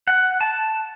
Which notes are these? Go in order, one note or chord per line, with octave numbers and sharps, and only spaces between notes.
F#5
A5